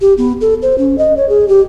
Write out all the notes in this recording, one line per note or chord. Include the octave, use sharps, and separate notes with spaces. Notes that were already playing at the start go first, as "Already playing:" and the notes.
G4
B3
A4
C5
C#4
D#5
C#5
G#4
G4